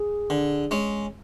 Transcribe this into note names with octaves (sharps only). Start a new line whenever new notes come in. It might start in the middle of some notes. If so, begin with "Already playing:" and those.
Already playing: G#4
D3
G#3 C#4